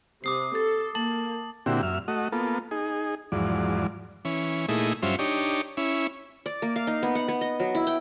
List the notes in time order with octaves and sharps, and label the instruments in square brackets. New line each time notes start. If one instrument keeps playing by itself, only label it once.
[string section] C3 [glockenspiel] D6 D#6 C7
[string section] A4 [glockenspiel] A6
[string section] A#3 [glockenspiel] A5 A6 F#7
[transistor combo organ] A#2 D3 C4 E4 F#4 G4
F#2 E5 F6
A3 F#4 D#5
A#3 B3 F4 A4
D#4 G#4
E2 G#2 F3 F#3 D5
E3 C#4
A#2 A3 D#4 E4 G#4
G2 F#3 C#4 F4 C5 E5
D4 D#4 G4 C#5
C#4 E4
[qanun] D5
A#3
F5
D#4
B3
F#5
B3
D#5
F#3
E4
G5